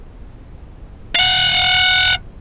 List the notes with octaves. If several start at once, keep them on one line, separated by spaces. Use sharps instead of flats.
F5 F#5